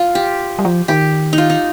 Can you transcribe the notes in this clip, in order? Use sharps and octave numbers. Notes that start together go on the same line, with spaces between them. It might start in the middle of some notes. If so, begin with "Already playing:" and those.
Already playing: F4
G4
G3
F3
D#3 G4
D#4
F4
D#4